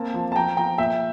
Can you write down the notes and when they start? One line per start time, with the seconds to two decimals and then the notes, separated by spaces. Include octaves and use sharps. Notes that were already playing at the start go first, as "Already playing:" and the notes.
Already playing: A#3 C4 A5
0.14 F3
0.32 A5
0.36 F3 G5 A#5
0.57 F3 G5 A#5
0.78 A#2 E5 G5